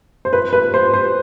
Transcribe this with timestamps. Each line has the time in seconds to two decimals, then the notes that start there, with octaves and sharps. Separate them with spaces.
0.25 C5
0.33 B4
0.53 B4
0.74 C5
0.94 C5